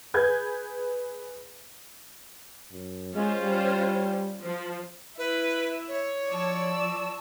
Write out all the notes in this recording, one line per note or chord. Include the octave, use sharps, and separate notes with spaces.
G#4 B4 G6 G#6
F#2
G#3 C#4 F4 C5
G3
F3
E4 B4
C#5
F3 D5 A5 C#6 E6